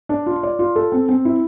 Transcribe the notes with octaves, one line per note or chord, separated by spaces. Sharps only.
D4
F4
D5
F4
A4
C4
C4
E4